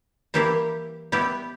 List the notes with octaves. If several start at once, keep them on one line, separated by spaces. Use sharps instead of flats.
E3 G3 A#3 E4 G4
G3 B3 E4 G4